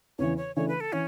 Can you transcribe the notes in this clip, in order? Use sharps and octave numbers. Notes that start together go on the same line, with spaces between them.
E2 C#3 E3 C#5
C#5
C#3 E3 A3 D4 C#5
B4
A4
E3 C#4